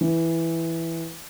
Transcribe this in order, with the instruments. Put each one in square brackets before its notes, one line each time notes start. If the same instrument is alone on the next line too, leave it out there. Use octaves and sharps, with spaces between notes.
[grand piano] E3